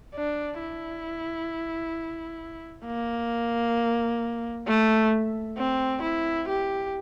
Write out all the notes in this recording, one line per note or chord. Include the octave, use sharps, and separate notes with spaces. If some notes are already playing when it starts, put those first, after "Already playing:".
D4
E4
A#3
A3
C4
E4
G4